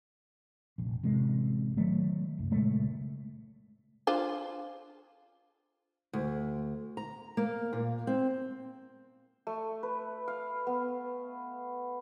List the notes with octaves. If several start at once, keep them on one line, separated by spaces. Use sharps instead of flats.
F1 A#1
A1 C3 G#3
D#3 F#3 A3
C2 F#2
A#2 C#3 G#3 A3
D4 F4 C5
D2
A#5
A#3
A#2
C4
A3
B4
F5
B3